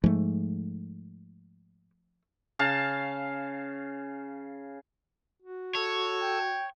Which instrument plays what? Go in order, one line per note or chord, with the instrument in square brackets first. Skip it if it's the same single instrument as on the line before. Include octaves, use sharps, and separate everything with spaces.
[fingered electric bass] G#2 [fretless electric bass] F3 A3
[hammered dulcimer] C#3 F5 A5
[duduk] F#4
[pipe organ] A4 E6 [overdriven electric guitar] C#5
[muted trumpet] G5